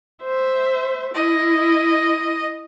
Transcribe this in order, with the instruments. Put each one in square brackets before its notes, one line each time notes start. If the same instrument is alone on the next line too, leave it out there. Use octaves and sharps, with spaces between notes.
[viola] C5 E5
[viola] E4 [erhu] D#5